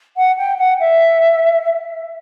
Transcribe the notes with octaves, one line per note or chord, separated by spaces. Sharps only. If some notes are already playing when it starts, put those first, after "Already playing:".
F#5
G5
F#5
E5